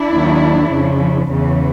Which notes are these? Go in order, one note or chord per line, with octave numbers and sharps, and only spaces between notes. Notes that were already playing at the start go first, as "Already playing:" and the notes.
Already playing: D4 E4
D#2 D#3 F#3
F2 C#3 F3
E2 C#3 E3